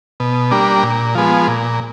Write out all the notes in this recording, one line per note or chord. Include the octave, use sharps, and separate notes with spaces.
B2
G3 A#3 D4
A#2
F3 G#3 B3
A#2